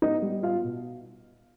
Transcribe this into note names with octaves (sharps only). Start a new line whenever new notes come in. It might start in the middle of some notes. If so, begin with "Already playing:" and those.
B3 D#4 D#5
G3
B3 F4 F5
B2